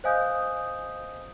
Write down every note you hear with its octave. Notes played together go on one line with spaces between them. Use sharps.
C5 D#5 F5 G#5 D#6 G6